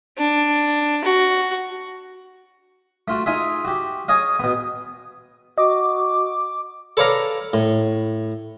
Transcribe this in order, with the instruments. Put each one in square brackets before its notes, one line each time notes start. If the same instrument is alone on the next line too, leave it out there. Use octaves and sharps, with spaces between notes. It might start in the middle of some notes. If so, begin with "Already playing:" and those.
[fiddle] D4
F#4
[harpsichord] A3 F4 F#4
D#4 F4 G#4 E5
F#4 G4
G#4 C#5 D#5 F5
B2 B3
[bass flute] F#4 [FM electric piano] D#5 [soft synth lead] D6
[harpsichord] A4 B4 C#5 D5 F5 A#5
A2